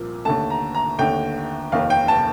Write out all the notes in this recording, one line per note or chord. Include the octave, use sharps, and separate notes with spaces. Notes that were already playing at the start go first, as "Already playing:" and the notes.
Already playing: C2 A#2 F3 A#3
D#2 D3 A3 A5
A#5
A#5
D#2 D3 A3 G5
F1 D#2 D#3 F5
G5
A5